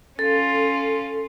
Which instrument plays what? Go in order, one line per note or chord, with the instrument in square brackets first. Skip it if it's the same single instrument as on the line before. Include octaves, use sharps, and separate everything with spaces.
[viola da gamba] C#4 F4 [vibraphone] A4